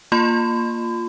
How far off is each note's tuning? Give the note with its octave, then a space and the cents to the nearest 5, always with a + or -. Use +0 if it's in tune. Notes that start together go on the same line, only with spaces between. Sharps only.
A#3 +0 F4 +0 B5 +45